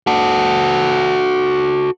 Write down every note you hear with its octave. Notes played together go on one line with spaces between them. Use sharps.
F#4 A4